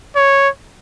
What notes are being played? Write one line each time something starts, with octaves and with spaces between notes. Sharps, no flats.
C#5